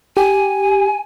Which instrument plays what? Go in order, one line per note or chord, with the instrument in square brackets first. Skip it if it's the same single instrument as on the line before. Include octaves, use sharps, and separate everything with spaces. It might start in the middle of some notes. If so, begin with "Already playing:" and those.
[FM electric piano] G4 [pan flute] G#5